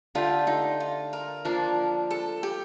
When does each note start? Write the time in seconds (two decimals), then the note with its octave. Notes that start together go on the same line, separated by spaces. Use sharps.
0.15 D3 A3 D4 F4 G4
0.47 D#4
0.80 F4
1.13 A#4
1.45 F3 A#3 D4
2.11 A4
2.43 G4